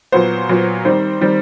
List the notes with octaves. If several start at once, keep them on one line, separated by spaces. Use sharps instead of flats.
A#2 F#3 B3 C5
A#2 F#3 B3
D#3 G3 C4 C5
D#3 G3 C4